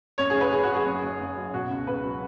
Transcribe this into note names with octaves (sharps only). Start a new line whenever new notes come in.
F#2 C#5
G#4
F#1
B4
F#1 G#4
F#4
F#3
G#4
F#2
F#1
F#1
F#3
B2 F#4
C#2
C#2 B4
F#3